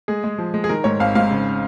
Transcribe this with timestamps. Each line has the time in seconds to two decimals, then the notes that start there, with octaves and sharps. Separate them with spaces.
0.08 G#3 G#4
0.24 G#3
0.38 F3
0.54 G#3
0.64 G#4
0.69 D#3 A#4
0.84 G#2 C#5
1.00 G#1 F5
1.15 G#2 F5
1.30 C#3